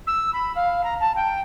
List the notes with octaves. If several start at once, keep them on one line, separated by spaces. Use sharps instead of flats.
E6
B5
F5
A#5
A5
G5